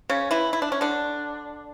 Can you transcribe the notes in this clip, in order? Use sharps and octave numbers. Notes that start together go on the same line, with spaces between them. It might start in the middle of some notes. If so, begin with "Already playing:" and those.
C#3 C#4
E3 E4
E4
D4
C#4
D3 D4